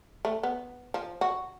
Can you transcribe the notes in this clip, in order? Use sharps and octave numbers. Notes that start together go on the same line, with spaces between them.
A3
B3
F3
F#4